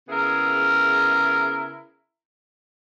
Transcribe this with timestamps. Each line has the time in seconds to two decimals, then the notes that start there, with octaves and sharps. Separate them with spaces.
0.08 C#3 B3 E4 G#4 A#4